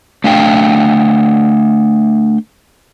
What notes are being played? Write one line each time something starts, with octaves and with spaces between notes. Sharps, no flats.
A3 D4 F5 G5